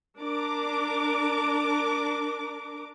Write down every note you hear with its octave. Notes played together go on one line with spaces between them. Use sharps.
D4 A#4 D6